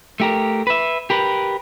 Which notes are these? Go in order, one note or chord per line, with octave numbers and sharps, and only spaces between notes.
A3 G4 A#4
B4 E5
G4 A#4 B4